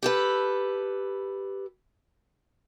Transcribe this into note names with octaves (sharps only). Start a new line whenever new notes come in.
G4 A4 B4